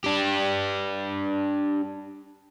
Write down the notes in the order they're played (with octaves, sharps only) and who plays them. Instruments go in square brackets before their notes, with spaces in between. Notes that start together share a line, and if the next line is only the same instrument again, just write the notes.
[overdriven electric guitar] D4 G4